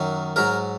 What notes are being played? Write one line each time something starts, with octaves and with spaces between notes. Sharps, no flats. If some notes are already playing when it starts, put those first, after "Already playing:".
Already playing: F#2 D#3 F#3
G#2 F#3 A#4